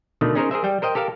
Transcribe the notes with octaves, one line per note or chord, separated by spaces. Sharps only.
B2 D3 D#3 A3
C#4 D#4 G#4 A#4 C5 C#5
G#4 A#4 C5 E5
G3 G5
A#4 C5 D#5 G5
G4 A4 A#4 F5